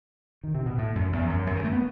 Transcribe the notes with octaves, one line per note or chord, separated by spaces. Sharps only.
D#3
C3
B2
A2
F#2
E2
F#2
F#2
D#3
A3
B3